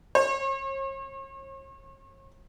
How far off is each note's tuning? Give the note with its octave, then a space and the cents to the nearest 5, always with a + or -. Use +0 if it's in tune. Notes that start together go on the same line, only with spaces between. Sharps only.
C#5 -45